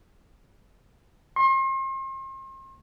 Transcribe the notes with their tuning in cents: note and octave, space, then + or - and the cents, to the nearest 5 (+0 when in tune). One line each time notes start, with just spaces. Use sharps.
C6 +40